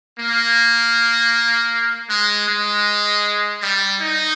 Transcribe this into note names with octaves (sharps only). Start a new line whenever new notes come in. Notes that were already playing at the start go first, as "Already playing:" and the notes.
A#3
G#3
G#3
G3
D#4